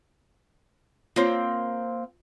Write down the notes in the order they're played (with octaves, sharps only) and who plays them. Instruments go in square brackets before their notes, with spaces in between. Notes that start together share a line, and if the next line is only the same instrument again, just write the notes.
[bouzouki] A#3 C4 [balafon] F4 C#5